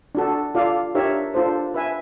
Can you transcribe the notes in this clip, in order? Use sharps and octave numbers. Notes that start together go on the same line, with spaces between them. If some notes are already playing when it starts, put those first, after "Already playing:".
D4 F#4 A4
F4 A4 D5 F5
D4 G4 A#4 C#5 E5
D4 F4 A4 C5
B4 E5 G#5